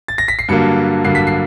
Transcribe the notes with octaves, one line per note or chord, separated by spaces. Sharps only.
A6
A#6
B6
C7
G2 D3 F#3 A#3 C#7
G2 D3 F#3 A#3 C7
B6
C7